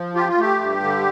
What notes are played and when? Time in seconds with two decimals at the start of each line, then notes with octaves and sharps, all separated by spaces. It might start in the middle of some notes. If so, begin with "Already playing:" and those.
Already playing: F3
0.15 F4 G4
0.28 F4
0.37 A3 G4
0.61 G2
0.83 D3